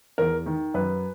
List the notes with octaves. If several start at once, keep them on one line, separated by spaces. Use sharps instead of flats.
E2 A#4
D#3
F#2 B4